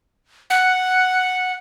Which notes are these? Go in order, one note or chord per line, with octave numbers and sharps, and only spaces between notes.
F#5